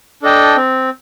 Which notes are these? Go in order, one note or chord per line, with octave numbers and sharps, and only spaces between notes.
D4 A4 D#5 G5
C4